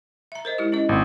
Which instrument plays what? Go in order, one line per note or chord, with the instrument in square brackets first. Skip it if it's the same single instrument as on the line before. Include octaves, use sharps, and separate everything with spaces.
[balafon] E5 A#5
A#4 C5 D#5
G#3 E4 G4
C#4 E4 D#5
[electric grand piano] G#1